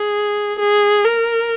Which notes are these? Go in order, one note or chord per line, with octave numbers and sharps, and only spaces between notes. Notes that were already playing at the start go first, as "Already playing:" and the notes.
Already playing: G#4
G#4
A#4